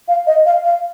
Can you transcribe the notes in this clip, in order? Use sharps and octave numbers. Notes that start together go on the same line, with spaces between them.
F5
D#5
F5
F5